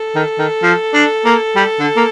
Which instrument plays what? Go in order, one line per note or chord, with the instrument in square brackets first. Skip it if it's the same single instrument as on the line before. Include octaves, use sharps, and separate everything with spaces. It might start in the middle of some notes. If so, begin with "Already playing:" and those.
Already playing: [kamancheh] A4
[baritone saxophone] D#3
D#3
F3
D4
A#3
G3
D3
A#3